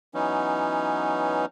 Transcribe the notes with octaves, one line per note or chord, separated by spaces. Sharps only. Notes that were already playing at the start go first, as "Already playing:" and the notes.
E3 F#3 B3 C#4 D#4